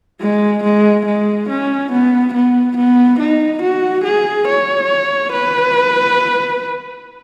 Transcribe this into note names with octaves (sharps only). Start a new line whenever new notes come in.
G#3
G#3
G#3
C#4
B3
B3
B3
D#4
F#4
G#4
C#5
B4